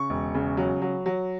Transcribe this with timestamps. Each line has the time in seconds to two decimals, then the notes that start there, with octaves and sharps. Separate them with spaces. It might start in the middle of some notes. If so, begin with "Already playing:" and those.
Already playing: C#3 C#6
0.10 E1
0.34 C#3
0.57 F#3
0.82 F#3
1.06 F#3